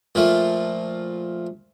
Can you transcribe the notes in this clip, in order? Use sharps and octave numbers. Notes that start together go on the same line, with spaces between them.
A#2 F3 A3